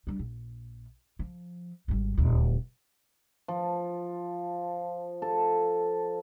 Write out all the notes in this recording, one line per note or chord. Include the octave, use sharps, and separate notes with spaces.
G3 D4
A#1
F3
G#1 G3
D#1 D2
F3
A4